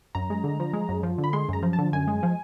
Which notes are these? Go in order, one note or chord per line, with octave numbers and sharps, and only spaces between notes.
F#2 A#5
G#3
D3
F3
G#3
F#2
F3
D3
B5
G#3 C6
F#2 A#5
F3
A5
D3
F#2 G#5
G#3
F3